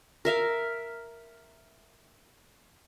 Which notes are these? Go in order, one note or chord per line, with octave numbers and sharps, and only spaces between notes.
A#4 E5 F5